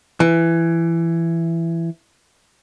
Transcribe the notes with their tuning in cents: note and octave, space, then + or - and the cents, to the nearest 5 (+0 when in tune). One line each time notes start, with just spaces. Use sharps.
E3 +15